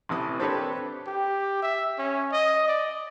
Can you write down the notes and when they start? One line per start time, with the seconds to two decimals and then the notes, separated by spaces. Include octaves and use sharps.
0.09 A1 C3 E3 D#6
0.40 C4 D4 G4 A4 B4 C#5
1.07 G4
1.62 E5
1.99 C#4
2.32 D#5
2.68 D5